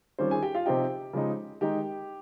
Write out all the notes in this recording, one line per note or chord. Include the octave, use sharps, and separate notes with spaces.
D#3 G3 C4 C#4 F4 C5
G#4 G#5
G4 G5
F4 F5
C3 F3 C4 D#4 G4 G5
C#3 F3 G#3 D#4
D#3 G#3 D#4 G4 G5